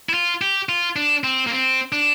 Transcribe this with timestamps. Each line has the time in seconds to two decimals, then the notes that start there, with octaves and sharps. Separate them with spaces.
0.09 E4
0.14 F4
0.42 G4
0.69 F4
0.96 D4
1.24 C4
1.47 A#3
1.51 C4
1.92 D4